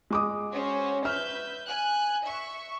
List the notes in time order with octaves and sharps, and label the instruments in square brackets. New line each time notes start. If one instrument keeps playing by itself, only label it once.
[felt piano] G#3 D6 D#6
[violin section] C#4 F#4 C5
[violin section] B4 E5 G6 [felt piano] F6
[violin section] G#5 F#6
E5 C#6